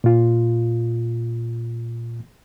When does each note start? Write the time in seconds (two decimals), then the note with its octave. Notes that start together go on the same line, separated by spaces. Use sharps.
0.04 A#2 F4